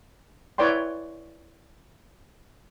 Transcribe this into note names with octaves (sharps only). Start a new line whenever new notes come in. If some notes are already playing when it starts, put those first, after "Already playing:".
E4 B4 C#5 D5 G5 C6